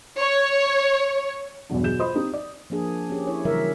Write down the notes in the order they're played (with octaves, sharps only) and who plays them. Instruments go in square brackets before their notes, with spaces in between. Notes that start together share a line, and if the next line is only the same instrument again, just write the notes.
[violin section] C#5
[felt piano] E2 G2 B2 F#3 D4
B2 F#3 G#4 G6 E7
F4 C5 D#5 B5 D#6
C4 D#4 G4
D5
[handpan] F3 A#3 D4 G#4
C#4 G4 G#4
E4 C#5
C#3 E3 F#3 G3 A#4 E5